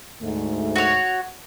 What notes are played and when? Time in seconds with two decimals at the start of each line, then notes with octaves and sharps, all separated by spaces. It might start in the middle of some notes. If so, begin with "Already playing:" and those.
0.22 D2 G#2 A3
0.76 F#4 C#5